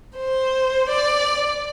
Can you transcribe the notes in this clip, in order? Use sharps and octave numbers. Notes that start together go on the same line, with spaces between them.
C5
D5